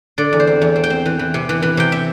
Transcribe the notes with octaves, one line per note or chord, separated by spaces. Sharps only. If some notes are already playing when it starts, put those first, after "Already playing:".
D3 D5
E2
C5
C4
E2
C4
G5
C4
E3
E3
C3
E3
E3
C3 G5
E5